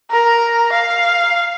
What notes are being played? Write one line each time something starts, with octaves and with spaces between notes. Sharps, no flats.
A#4
F5